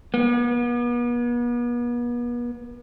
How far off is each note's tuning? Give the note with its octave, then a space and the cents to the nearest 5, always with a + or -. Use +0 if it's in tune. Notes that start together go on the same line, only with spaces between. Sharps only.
B3 -40